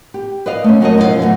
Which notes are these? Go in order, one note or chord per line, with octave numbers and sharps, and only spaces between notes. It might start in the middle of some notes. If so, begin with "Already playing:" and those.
G4
B4 D5 D#5 F5
A3 C#4
F#3 A3 F#4 A#4 C#5 D#5
F#2 B2 F3 E4 G#4 F5
D3 F#3 A3 D#4